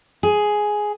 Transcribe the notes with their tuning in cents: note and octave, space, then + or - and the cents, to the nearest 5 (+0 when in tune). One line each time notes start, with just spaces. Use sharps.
G#4 +5